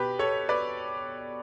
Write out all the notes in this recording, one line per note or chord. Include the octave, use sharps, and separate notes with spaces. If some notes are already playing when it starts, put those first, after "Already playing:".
Already playing: B2 G4 B4
A4 C#5
B4 D5